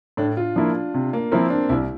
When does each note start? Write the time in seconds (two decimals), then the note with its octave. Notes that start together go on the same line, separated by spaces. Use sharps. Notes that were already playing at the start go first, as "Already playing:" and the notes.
0.17 A2 D4
0.37 F4
0.56 F3 A#3 D4 E4
0.94 C3
1.13 A#3
1.31 F3 A#3 C4 E4 A#4
1.50 D4
1.69 C2 E4